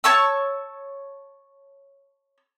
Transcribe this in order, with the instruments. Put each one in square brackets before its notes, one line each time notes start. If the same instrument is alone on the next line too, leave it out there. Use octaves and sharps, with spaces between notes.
[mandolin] C#5 A5 C#6 E6